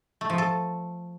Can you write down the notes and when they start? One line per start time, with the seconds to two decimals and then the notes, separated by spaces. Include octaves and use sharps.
0.21 A3
0.30 F3
0.38 A4